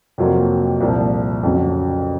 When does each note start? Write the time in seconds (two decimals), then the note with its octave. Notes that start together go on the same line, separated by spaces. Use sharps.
0.18 F2 C3 F#3 A#3 F4
0.80 C2 A#2 F3
1.43 F2 C#3 F#3